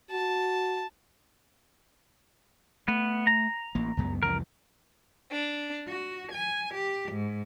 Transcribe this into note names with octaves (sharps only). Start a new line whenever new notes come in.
F#4 A5
A3 B3
A#5
A1 A#3
C#2 F#2 B3
C2 F2 E3 A#4
D4
F#4
G#5
G4
G#2